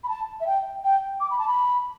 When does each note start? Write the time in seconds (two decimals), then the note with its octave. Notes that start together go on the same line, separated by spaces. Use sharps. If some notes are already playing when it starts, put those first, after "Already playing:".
0.04 B5
0.09 A5
0.40 E5
0.46 G5
0.84 G5
1.20 D6
1.30 B5
1.39 A5
1.47 B5